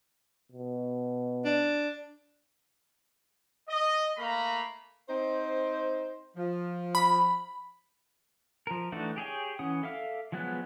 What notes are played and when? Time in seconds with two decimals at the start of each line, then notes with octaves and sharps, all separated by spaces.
0.52 B2
1.45 D4
3.69 D#5
4.18 A3 A#3 F5 A#5 B5
5.09 C4 D#4 C5
6.37 F3
6.95 B5
8.67 F3 A#4
8.92 E3 A3 D4 D#4 F#4
9.16 G4 G#4 C#5 G5
9.59 E3 C#4 F#5 D#6
9.83 A4 E5 F5 D6 F6
10.32 F3 F#3 G#3 B3 F#6